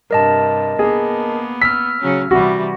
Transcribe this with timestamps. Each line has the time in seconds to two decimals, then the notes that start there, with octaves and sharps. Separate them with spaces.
0.11 G2 C3 A#4 D#5 A5
0.79 A#3 B3 G#4
1.61 E6 F6 B6
2.00 C#3 F#3 C#4
2.31 C3 E3 G3 F#4